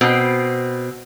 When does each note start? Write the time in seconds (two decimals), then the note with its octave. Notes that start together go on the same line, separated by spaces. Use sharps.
0.01 B2 C4